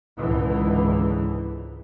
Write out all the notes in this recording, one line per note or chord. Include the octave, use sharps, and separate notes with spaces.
C#2 G#2 D3 E3